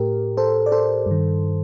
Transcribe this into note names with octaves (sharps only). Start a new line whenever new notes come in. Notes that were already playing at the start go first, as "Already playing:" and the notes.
Already playing: A2 G4 A#4
A4 C5
D5
A4 C5
G2 D#3